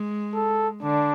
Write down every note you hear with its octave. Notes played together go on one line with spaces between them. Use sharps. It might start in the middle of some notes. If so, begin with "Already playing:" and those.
Already playing: G#3
A4
D3 D4